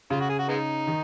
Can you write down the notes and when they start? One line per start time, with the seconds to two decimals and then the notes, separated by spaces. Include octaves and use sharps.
0.10 C#3 F4
0.21 F#4
0.30 G#4
0.39 F#4
0.49 G#3 B3 D#4
0.87 D#3